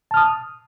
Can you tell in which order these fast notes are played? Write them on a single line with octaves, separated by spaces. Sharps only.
A5 F6 D#6